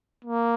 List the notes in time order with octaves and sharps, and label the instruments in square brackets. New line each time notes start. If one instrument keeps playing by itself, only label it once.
[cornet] A#3